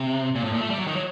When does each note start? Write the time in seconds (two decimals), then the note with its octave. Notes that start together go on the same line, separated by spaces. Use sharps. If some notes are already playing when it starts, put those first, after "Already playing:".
Already playing: C3
0.35 A#2
0.44 A2
0.52 A#2
0.61 A3
0.70 G3
0.79 F#3
0.87 D#3
0.96 F#3